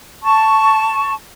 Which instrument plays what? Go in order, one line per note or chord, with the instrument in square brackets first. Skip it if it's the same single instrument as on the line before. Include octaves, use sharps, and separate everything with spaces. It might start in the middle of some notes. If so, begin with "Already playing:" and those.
[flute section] A5 C#6